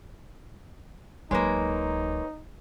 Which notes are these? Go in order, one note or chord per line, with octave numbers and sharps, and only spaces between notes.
D1 F#3 G#3 A#3 D#4 B4 C#5 G#5